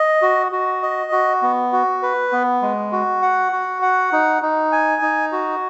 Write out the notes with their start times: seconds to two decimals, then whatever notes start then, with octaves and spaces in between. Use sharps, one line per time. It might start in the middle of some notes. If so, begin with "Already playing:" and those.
Already playing: D#5
0.22 F#4
0.52 F#4
0.82 D#5
1.12 F#4
1.42 B3
1.73 F#4
2.02 B4
2.32 B3
2.62 G#3
2.92 F#4
3.22 F#5
3.52 F#4
3.82 F#5
4.12 D#4
4.42 D#4
4.72 G#5
5.02 D#4
5.32 F#4